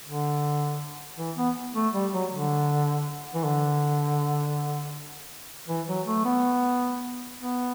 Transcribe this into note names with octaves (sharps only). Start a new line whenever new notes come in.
D3
E3
B3
A3
G3
F#3
D3
E3
D3
E3
F#3
A3
B3
B3